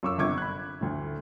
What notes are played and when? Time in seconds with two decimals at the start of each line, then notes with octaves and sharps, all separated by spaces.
0.03 F#2 F4 C#6 D6 E6
0.18 G1 C3 C#6 D6 G#6
0.38 B5 F#6
0.81 D2 A2